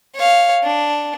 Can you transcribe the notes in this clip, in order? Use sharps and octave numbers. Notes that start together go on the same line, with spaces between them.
C#5 F5
D4